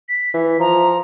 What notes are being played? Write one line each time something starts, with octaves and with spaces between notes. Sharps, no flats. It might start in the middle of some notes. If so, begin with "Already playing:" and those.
B6
E3
F3 A#5